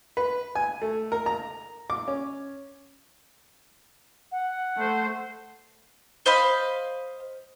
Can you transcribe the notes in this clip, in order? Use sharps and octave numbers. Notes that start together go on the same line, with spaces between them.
B4
G#5
A3
A#4
A#5
D6
C#4
F#5
A3 C5
C5 D#5 F5 B5